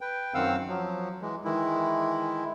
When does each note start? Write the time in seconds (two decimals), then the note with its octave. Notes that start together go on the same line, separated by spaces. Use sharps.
0.01 B4 G5
0.34 F#2 D#3 C4 F5 F#5 E6
0.68 F3 F#3
1.22 E3 G#3
1.44 D#3 E3 G#3 E4